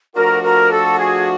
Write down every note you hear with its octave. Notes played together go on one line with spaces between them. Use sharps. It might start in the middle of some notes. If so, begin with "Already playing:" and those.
F3 A3 D4 F#4 A#4
A#4
A4
G#4